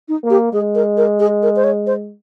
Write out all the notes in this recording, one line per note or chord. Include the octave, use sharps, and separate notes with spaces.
D#4
A#3
G4
G#3 G#4
A#4
A#4
G#4
A#4
C5
C#5
C5